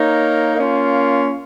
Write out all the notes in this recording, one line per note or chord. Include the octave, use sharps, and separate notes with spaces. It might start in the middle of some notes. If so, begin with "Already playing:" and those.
Already playing: A#3 D#4 A#4 C#5
A#3 C#4 F4